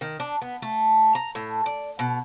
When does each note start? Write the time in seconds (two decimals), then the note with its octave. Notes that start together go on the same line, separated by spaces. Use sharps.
0.01 D#3
0.20 D4
0.42 B3
0.62 A3
1.15 A#5
1.35 A2
1.66 D5
1.99 B2